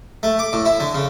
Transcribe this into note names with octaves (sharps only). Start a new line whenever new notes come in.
A3
D6
A2
E4
D3
C#3